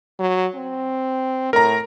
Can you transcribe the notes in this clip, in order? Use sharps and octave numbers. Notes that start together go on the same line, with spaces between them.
F#3
C4
A2 A#4 A#5